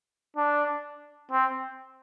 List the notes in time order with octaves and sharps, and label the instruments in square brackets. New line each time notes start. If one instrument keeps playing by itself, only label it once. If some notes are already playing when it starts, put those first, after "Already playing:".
[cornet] D4
C4